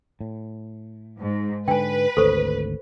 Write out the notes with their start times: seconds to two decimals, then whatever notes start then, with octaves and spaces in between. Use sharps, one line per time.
0.21 A2
1.20 G#2
1.68 G#2 D3 B4 G5 G#5
2.17 G#1 D2 A4 C5 C#6